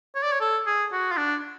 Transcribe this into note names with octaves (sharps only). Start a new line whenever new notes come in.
C#5
D5
C#5
A4
G#4
F#4
F4
D4